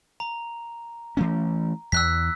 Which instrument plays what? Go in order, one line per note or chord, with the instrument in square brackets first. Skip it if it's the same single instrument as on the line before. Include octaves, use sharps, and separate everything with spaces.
[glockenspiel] A#5
[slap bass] E3 A3 C#4
[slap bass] E2 [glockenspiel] E6 F#6 B6